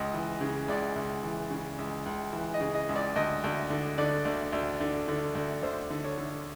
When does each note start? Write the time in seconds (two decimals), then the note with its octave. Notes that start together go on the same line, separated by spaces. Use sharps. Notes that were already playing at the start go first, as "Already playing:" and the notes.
Already playing: C#2 D#5
0.14 E3
0.41 C#3
0.68 C#2 D5
0.96 C#2
1.23 E3
1.51 C#3
1.78 C#2
2.06 C#2
2.33 E3
2.54 D#5
2.61 C#3
2.74 D#5
2.89 C#2
2.96 D5
3.16 D2 D#5
3.44 D2
3.70 D3
3.98 D3 D5
4.25 D2
4.53 D2
4.80 D3
5.08 D3
5.35 D2
5.63 D2 C5
5.90 D3
6.04 C#5
6.18 D3